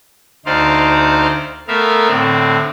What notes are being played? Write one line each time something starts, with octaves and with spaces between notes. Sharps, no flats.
D2 D#4 C5 D5 F5
A3 B3 A#4 E5 F5
A2 D3 C4